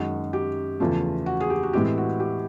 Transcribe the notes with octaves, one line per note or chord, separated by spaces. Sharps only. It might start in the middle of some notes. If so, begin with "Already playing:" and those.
Already playing: F#2 D#3 G#3 F#4
G4
E2 C#3 F3 A3 F4
F#4
G#4
G4
F#4
A2 E3 G#3 C4 G4
F#4
G4